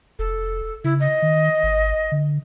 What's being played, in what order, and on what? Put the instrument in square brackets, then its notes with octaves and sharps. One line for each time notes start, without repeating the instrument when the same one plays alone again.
[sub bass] F1 [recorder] A4
[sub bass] C#3 [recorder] E4
[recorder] D#5
[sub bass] D#3
G#1
D3